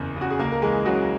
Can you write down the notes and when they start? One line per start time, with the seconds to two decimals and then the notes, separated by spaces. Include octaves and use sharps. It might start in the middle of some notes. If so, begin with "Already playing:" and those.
Already playing: F#1 E2
0.16 C#3 F#4
0.30 G#4
0.39 C#2 A#3 A#4
0.52 A#4
0.62 E3 G#3 G#4
0.85 C#3 F#3 F#4